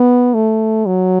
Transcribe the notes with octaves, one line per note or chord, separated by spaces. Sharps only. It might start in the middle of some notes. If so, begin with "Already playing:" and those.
Already playing: B3
A3
F#3